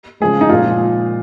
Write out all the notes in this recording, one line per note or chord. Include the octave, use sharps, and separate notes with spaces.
C#3 F3 G#3 G#4
D#4
A#2 F3 G#3 F4